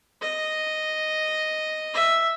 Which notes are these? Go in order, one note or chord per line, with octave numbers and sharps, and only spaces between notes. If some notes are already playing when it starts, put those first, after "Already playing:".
D#5
E5